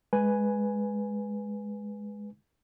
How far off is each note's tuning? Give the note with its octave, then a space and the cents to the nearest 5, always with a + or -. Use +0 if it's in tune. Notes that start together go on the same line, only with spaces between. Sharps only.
G#3 +0 B4 +0 G#5 +0